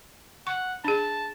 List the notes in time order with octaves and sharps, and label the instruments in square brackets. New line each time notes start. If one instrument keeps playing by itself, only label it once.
[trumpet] F#5 [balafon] C#6
[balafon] D4 G#4 [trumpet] A5